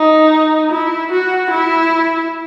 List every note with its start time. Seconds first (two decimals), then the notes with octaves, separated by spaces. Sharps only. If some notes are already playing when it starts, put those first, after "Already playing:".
Already playing: D#4
0.72 E4
1.12 F#4
1.51 E4